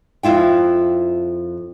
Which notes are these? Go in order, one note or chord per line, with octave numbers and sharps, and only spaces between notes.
F2 E4 F4 G5